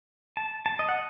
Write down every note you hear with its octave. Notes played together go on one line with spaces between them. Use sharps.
A5
A5
D#5
F#5